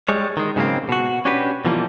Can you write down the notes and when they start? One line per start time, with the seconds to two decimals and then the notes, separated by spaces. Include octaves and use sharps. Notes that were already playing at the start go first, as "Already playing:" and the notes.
0.08 G3 G#3 C#5
0.37 D#3 G#3
0.56 G#2 C#3 F#3 G#3 A#3 C4
0.89 B2 F#4
1.25 C#4 D4 F#4 G4 B4
1.65 B2 D3 E3 F3 G3 A#3